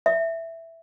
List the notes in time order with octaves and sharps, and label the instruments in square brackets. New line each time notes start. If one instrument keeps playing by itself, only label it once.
[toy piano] E5